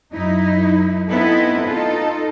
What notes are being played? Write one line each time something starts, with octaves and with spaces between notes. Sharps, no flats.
F#2 F#3 D#4 E4
B3 C4 D#4 E4 A4 B4
D#4 F4 A4